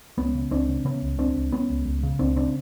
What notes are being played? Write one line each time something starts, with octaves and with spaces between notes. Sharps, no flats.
C#2 B3 C#4
C#3
C#2 C4 D4
C#3
C#3 B3 C#4
C#2
C#2 C4 D4
C#2
C#2 B3 C#4
C#2
C#2
C#3
C#2 C4 D4
C#3 C4 D4